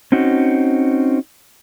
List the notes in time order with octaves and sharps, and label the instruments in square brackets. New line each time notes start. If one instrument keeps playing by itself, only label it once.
[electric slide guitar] C4 C#4 D#4 F#4